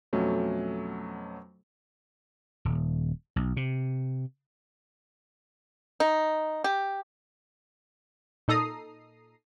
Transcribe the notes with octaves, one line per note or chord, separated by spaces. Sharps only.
F2 B2 F#3 A3 C#4
D#1
B1
C3
D#4
G4
A#2 D#4 A4 A#5 D#6 C7